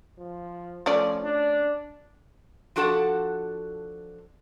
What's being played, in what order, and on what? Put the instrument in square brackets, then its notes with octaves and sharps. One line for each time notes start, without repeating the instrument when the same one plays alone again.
[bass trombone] F3
[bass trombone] F3 [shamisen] A3 C#4 D5
[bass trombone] D4
[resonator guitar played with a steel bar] F3 D4 F#4 A4 F#5 A5